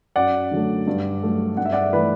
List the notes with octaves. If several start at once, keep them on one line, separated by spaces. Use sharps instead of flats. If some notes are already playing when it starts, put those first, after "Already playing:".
F#2 D5 F#5
D3 F#3 A3
G2
F#3 A3
G2 F#5
E5
D5 F#5
E3 A3 B4 D5